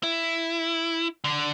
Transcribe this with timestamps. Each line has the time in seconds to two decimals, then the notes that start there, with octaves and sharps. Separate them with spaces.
0.03 E4
1.24 D3